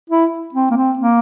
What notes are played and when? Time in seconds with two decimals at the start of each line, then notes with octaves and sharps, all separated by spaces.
0.10 E4
0.54 C4
0.71 A#3
0.77 C4
0.99 A#3